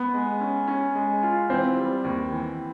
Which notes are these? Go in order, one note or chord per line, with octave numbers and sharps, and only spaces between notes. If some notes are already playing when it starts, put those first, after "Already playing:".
Already playing: B3
G#3
C#4
C#4
G#3
F4
E3 C4
G3
D#2
E3